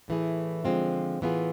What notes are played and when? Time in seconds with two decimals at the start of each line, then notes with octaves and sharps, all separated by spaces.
0.08 A2 E3 A3 E4 G#4
0.65 D3 F3 G#3 C4 F4
1.21 A2 E3 B3 F4 G#4